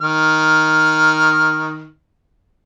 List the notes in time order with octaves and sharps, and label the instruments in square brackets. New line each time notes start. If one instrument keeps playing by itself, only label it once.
[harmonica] D#3 F6